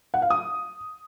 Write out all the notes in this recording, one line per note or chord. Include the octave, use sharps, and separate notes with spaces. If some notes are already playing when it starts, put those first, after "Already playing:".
F#5
F5
D#6